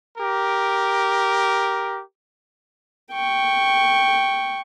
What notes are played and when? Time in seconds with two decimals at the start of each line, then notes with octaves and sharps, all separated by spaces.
0.18 G4 A#4
3.12 G5 C#6